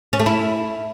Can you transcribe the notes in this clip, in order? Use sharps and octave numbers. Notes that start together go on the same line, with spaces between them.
C#4
A3
E4